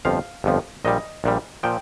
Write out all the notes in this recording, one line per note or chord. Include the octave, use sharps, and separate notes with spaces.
G1 F2 F3 F5
G1 F2 F3
A#1 A#2 G3 D#5
A#1 A#2 G3
A#2 F3 G5